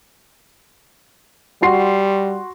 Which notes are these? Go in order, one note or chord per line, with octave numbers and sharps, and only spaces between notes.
G3 F#4 C6 C7